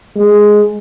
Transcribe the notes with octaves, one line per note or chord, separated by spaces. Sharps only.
G#3